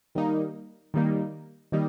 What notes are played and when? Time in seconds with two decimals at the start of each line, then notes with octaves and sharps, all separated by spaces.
0.15 D#3 G3 A#3 D#4
0.94 D#3 G3 A#3 D#4
1.72 D#3 G3 A#3 D#4